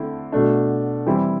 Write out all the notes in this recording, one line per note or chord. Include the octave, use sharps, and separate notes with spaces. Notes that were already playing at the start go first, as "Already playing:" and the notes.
Already playing: D3 A3 C4 E4
B2 A3 D4
E3 G3 C4 E4